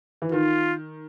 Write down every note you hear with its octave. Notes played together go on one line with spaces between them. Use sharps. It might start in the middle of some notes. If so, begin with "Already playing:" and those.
E3
D#3 F4